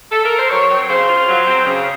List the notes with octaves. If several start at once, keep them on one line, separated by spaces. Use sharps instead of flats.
A4
A#4
C5
F#3 C#5
C4
C#3 C5
F4
F#3
C4
C#3